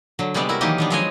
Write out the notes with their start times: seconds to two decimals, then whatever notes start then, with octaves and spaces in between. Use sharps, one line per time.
0.19 D3 F#3
0.34 C3 G3 G#3 B3 D5
0.49 E4 F#4 A#4
0.61 D#3 E3 F#3 A#3 G4 D#5
0.78 D#3 B3 D4
0.90 F3 F#3 G#3 C#5 D#5 G#5